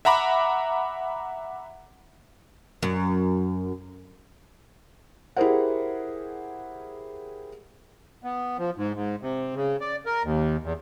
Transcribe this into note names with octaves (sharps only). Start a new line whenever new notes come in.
E5 F#5 A#5 B5 D6
F#2
E4 G4 G#4 A#4 C5 F#5
B3
F3
G#2
G#2
C3
C#3
D5
A#4
D#2
E2